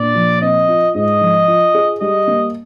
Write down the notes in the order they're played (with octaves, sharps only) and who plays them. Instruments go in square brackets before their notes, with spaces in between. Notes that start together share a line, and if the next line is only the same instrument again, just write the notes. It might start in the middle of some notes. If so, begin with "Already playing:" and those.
Already playing: [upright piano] A#2 D4 [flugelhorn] D5
[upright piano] F3
[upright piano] C4 [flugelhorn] D#5
[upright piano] F4
[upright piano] G#2 [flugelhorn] D#5
[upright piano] F3
F4
G#4
[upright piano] G3 [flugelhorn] D#5
[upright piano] A#3